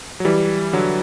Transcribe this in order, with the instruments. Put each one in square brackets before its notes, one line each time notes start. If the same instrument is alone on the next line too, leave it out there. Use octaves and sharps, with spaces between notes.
[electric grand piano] F#3
E3 G3
D3 F#3